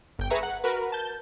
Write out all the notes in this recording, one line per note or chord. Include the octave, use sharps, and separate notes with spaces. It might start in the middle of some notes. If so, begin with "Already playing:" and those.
G1 G5
G#4 B4 E5 A#5 C#6
F#5
F#4 A#4 B4
A5 G6